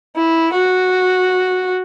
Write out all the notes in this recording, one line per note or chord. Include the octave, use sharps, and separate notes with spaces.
E4
F#4